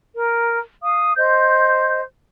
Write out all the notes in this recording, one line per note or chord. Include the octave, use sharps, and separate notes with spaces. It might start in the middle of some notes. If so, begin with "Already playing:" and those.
A#4
F5 D#6
C5 D#5 G6